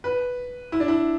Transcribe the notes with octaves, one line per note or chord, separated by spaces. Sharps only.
B4
E4
D4
E4